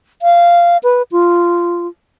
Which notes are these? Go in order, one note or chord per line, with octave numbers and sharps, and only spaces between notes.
F5
B4
F4